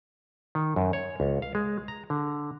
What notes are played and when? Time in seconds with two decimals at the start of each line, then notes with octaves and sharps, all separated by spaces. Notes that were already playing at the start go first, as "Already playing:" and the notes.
0.55 D#3
0.76 F#2
0.93 C#5
1.20 C#2
1.42 F5
1.55 G#3
1.88 A#5
2.10 D3